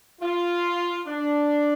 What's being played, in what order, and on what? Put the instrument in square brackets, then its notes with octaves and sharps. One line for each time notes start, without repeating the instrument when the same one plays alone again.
[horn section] F4
D4